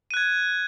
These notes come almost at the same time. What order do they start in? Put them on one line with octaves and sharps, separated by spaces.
D#7 F#6 G#6